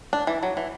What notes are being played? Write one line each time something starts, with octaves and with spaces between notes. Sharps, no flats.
D4
E3
F#3
E3